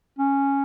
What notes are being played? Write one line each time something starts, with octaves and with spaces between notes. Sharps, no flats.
C#4